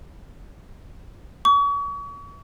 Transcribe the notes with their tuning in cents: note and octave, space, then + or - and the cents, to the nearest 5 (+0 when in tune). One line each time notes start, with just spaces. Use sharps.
C#6 +40